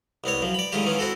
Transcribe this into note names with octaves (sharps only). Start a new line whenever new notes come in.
C2 B3 C4 C#5
F#2 F3
D5 B5
A2 D3 D#3 G#3 F4 G4
D#3 E3 B3 C#4 F4
C4 E4 F#4 A4